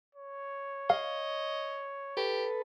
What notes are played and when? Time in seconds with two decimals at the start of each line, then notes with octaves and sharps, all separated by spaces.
0.15 C#5
0.90 D#5 F5
2.17 G4 A4 B4